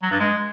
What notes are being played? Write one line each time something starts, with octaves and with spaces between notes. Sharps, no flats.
F#3
G2
G#3